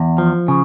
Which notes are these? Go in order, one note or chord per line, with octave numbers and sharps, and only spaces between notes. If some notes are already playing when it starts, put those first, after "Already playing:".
Already playing: E2
F3
C#3